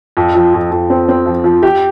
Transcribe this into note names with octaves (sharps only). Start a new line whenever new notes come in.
F2
F3
F2
F2
C4
C4
F3
F3
G4